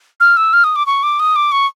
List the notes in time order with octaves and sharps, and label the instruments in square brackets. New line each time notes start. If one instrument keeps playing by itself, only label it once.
[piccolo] F6
E6
F6
D#6
D6
C#6
D6
D#6
D6
C#6